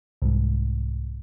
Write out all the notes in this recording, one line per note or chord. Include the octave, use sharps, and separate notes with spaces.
C2 G#2